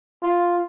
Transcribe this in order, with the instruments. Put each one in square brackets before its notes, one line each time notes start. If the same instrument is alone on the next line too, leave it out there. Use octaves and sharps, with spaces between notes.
[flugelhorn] F4